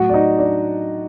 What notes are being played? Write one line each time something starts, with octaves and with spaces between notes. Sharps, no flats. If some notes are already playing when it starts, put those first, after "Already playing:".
Already playing: A2 F#3 F#4 F#5
D5
D#4 D#5
D4 D5